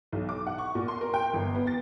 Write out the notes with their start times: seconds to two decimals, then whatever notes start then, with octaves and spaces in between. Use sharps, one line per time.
0.12 B1
0.29 D6
0.47 F#5
0.58 C#6
0.75 A#2
0.88 C6
1.01 A#4
1.14 G5
1.33 G1
1.55 B3
1.67 A6